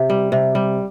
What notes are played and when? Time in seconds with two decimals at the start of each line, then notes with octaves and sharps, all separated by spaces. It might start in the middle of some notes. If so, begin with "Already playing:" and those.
Already playing: C3 G4
0.10 G3
0.32 C3
0.55 G3